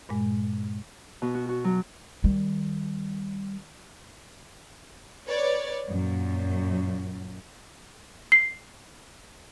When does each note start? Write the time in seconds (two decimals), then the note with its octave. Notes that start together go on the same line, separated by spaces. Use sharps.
0.09 G2 A#2 G#3
1.22 B2
1.35 F#4
1.49 F#4
1.64 F#3
2.24 D#3 G3
5.27 B4 C#5 D5
5.88 F#2 A#2
8.32 C7